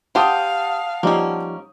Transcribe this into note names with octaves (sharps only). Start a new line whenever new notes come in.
G4 C5 F5 F#5 A5 D#6
F3 G3 A#3 C#4 D#4